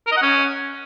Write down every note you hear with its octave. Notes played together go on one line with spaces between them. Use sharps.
A#4
D#5
F#5
C#4